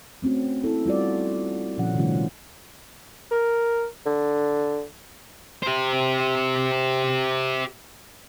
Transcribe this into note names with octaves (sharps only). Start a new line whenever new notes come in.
A3 C4 C#4 F#4
B3 E4 A4
G3 F4 F#4 D5
A#2 C#3 F3 C#4 F#5
C3 D#3 G3 A3 C#4 F4
A#4
D3
G4 C5